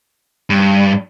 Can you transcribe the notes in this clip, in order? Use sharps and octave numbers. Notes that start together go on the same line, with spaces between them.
G2